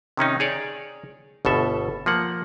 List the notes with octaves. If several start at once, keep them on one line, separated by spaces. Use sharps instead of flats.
C3 D#3 C#4 D#4
G#4 C#5 D5
G1 B2 A4 E5
F3 A#3 F#5